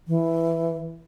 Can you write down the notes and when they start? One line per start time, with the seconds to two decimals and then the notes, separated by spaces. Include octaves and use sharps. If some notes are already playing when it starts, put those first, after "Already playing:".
0.08 E3